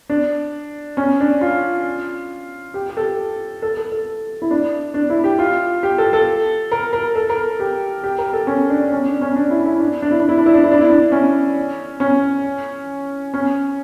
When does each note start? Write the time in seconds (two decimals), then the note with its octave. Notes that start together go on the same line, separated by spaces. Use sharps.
0.09 D4
0.97 C#4
1.20 D4
1.41 F4
2.74 G4
2.90 G4
2.97 A4
3.62 A4
3.77 A4
3.92 A4
4.42 E4
4.51 D4
4.94 D4
5.10 E4
5.24 G4
5.39 F4
5.83 G4
5.98 A4
6.13 A4
6.72 A#4
6.93 A#4
7.15 A4
7.29 A#4
7.60 G4
8.04 G4
8.18 A#4
8.33 A4
8.47 C#4
8.70 D4
8.92 C#4
9.07 D4
9.21 C#4
9.36 D4
9.50 E4
9.65 E4
9.80 D4
10.02 D4
10.11 E4
10.20 D4
10.29 E4
10.38 D4
10.46 E4
10.54 D4
10.64 E4
10.72 D4
10.81 E4
10.90 D4
11.12 C#4
12.00 C#4
13.34 C#4